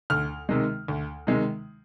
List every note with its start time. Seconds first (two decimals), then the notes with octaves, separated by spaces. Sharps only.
0.10 D2 F6
0.49 C3 D#3 G#3
0.88 D2
1.27 C3 D#3 G#3